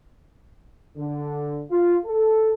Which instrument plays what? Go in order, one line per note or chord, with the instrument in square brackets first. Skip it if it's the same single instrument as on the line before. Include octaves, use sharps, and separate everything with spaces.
[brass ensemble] D3
F4
A4